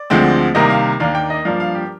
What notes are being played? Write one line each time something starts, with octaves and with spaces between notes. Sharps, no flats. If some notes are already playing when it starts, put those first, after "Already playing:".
Already playing: D5
D2 D3 F3 G#3 C4
C2 C3 D#3 A#3 D#5
F5
D#2 D#3 A#3 D4 F5
G5
D#5
G2 F3 A#3 D4 F5
F5
G4